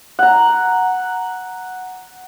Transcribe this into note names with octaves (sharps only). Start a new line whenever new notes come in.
F#5 A#5